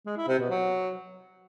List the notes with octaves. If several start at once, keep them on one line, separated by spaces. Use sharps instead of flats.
G#3
E4
C3
B2
F#3